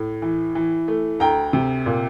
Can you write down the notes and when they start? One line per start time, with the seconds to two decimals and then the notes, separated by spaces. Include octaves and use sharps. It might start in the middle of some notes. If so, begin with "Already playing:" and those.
Already playing: A2
0.22 E3
0.55 E3
0.88 A3
1.20 D2 G5 A#5
1.53 C3
1.86 A#2